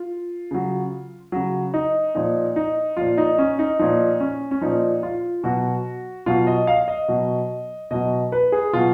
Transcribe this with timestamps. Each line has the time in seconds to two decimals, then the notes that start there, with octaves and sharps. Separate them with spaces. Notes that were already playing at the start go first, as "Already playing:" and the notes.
Already playing: F4
0.51 C#3 F#3
1.32 C#3 F#3
1.74 D#4
2.15 A#2 F3 D#4
2.56 D#4
2.97 A#2 F3 F4
3.18 D#4
3.38 C#4
3.59 D#4
3.79 A#2 F3 D#4
4.20 C#4
4.51 C#4
4.61 A#2 F3 D#4
5.03 F4
5.44 B2 F#3 F#4
6.26 B2 F#3 F4
6.47 D#5
6.67 F5
6.88 D#5
7.08 B2 F#3
7.91 B2 F#3 D#5
8.32 B4
8.52 G#4
8.73 B2 F#3 F4